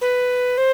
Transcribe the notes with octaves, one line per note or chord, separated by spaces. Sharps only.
B4
C5